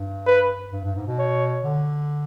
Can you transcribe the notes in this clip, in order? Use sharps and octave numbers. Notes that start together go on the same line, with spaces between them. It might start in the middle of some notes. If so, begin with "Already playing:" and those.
Already playing: G2
B4
G2
G2
G#2
B2
C#5
D3